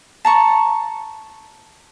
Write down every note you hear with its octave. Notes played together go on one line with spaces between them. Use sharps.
A5 A#5 C#6